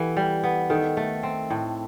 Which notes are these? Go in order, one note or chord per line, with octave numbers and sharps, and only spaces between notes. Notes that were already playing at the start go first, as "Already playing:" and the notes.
Already playing: E3 B3 G4 A4 B4
G3
B3
D#3 A4
A3
C4
A2